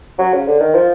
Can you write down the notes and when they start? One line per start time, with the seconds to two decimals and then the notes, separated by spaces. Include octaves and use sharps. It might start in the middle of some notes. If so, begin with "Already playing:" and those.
0.19 F#3
0.33 C#3
0.47 D3
0.60 D#3
0.75 F3